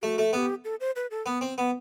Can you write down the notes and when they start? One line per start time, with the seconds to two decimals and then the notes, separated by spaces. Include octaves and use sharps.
0.02 A3 F#4 G4
0.18 A3
0.33 B3 G4 A4
0.65 A4
0.80 C5
0.96 B4
1.11 A4
1.26 B3
1.41 C4
1.58 B3